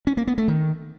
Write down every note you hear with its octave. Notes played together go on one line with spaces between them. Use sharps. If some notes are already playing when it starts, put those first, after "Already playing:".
C#4
A#3
B3
A3
D#3